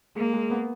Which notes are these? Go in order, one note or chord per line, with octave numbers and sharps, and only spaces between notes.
G#3 A#3
G#3
B3